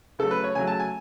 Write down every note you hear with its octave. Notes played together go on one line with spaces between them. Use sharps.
C#3 F#3 A3 A4
B4
C#5
C#3 F#3 A3 G#5
A5
G#5